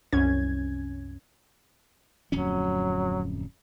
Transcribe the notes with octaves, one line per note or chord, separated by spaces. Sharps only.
C2 F#2 C#4 G#6
D1 F2 F#3 C#4